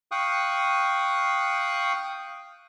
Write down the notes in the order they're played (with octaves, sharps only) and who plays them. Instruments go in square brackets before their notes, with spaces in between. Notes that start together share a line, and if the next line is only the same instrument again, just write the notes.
[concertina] F5 G5 C#6 D#6 F#6